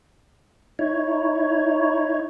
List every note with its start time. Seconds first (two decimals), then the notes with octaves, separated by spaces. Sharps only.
0.79 D#4 E4 C#5